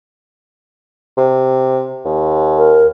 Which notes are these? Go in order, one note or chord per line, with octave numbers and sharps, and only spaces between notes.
C3
D#2
A#4